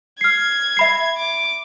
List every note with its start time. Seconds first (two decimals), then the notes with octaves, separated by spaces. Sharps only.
0.21 F6 G#6 C7
0.77 E5 B5 C7
1.17 D6